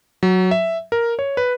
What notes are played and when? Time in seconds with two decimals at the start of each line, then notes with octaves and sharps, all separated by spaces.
0.23 F#3
0.51 E5
0.92 A#4
1.19 C#5
1.37 B4